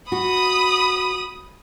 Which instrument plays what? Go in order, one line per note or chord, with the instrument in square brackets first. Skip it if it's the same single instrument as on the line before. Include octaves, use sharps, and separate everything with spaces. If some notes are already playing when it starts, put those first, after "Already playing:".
[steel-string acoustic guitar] F#4 [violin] B5 D#6